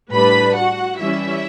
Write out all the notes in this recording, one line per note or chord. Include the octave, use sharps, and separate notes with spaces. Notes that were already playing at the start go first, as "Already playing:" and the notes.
A2 G3 D4 B4 B5
F#4 F#5
E3 G3 C#4 E4 E5